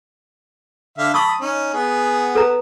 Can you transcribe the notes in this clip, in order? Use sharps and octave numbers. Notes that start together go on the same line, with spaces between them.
D3 E5 F5
A5 B5 C#6 D#6 E6
C#4 D#4
B3 G#4 F#5
A4 B4 A#5